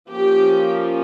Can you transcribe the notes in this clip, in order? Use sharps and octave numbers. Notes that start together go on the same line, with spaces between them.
F3 A#3 C#4 G4